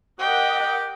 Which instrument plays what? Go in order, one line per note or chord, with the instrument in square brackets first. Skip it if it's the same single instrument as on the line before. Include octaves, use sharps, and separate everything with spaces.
[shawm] G4 [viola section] A#4 D#5 F#5 [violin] G5